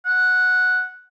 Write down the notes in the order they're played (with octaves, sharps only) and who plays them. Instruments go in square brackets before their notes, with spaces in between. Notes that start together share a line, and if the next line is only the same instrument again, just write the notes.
[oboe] F#5